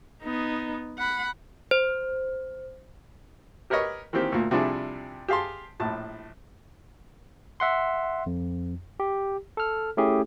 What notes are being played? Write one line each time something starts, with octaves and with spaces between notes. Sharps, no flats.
B3 D#4
F#5 B5
C5
G4 A#4 B4 C#5 D#5
D#3 E3 A#3 C4 G4
D2 A#2
C3 F3 G3 D4 E4 G#4
G4 G#4 F5 A5 C6
A#1 A2 A5
E5 F#5 C6
F2
G4
A4 F6
A3 C#4 E4 G4 G#4